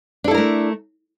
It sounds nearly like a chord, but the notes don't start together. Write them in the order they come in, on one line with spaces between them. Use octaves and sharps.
D4 A4 E4 A#4 A3